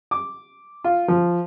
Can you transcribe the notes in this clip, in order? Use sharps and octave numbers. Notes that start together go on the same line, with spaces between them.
D6
F4
F3